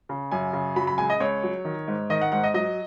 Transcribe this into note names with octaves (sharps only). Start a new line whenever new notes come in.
C#3
F#2 G#5
C#3
F#3 B5
B5
C#2 G#5
D#5
C#2 C#5
F#3
D#3
G#2
D#3 D#5
F#5
G#2 F#5
D#5
F#3 D#5